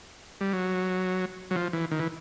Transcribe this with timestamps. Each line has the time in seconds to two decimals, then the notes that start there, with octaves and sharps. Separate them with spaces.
0.41 G3
0.53 F#3
1.51 F#3
1.56 F3
1.73 E3
1.91 D#3
1.99 E3